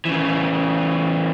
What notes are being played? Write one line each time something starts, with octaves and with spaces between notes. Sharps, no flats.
C#3 E3